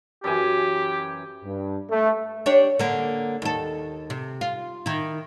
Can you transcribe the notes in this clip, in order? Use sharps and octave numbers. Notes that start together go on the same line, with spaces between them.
F#2 E3 G4 G#5
G2
A3
D4 G4 C#5
D3 A#3
D#2 A4
C3
F4
D#3 E4